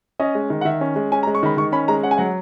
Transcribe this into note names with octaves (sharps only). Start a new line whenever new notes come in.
C#4 D#5
G#3
D#3
F#5
D#3 E5
C#4
G#3
C#4 G#5
A#5
G#3
C#6
D#3 B5
D#3 C#6
C#4 B5
G#3 A#5
C#4 F#5
G#5
F#3 F#5